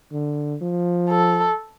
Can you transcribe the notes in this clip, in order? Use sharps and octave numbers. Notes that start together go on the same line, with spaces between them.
D3
F3
A4